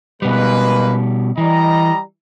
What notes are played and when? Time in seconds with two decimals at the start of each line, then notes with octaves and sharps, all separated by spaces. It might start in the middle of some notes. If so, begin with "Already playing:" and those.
0.22 B2 G3 G#3 A#3 B4
1.38 E3 G3 D#5 A#5